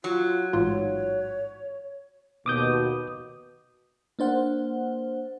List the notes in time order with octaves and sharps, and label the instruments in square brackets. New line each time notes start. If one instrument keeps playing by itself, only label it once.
[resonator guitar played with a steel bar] F#3 [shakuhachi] F4
[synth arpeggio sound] A1 G#2 F4 [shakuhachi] C#5
[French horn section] D#2 B2 [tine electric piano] D6 D#6 G6
[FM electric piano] A#3 D4 C5 F#5